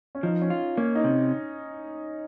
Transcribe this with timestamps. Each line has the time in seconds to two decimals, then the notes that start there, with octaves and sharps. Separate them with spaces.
0.15 C#4
0.23 F3 D#4
0.42 C#4
0.50 F4
0.77 A#3 C#4
0.95 D#4
1.04 C3